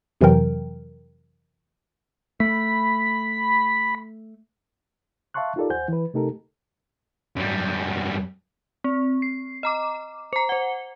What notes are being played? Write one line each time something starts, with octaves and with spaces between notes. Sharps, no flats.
F2 C3 E3 F#3 A#4 G5
A3 B5
E5 F5 A5 C6 C#6 F#6
D#4 F4 G4 A4 A#4 D5
D#2 C5 F#5 G#5 G6
E3 B4
C3 A3 D#4 G4 A4 A#4
F#2 G3
C4
C7
D#5 A#5 D6
C5 A#5
C5 F#5